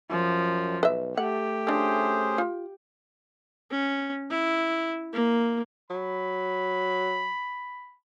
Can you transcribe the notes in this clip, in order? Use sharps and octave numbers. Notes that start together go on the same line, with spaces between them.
F#2 F3
B1 B4 D#5 E5
A3 G4 F#5
F3 C#4 D4 G#4 C5
F4
C#4
E4
A#3
F#3 B5